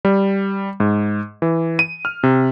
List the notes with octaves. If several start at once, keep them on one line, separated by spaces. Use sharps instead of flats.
G3
G#2
E3
D#7
F6
C3